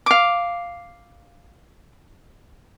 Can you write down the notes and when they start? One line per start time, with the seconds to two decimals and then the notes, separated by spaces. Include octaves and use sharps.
0.06 F5 D6